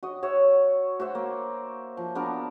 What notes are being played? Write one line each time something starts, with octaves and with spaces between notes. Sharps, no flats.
F#4 D#5
F#4 C#5 E5
F#4 C5 E5 F#5
A#3
F3
B3 D4 F#4 A#4